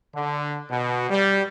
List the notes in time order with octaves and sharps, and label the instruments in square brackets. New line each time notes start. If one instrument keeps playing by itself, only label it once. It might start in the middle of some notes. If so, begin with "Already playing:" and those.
[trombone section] D3
B2
G3